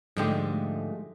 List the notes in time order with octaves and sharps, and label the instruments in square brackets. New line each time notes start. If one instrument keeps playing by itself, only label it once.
[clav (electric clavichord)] G#2 D3 G4 [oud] F3 G#3 A3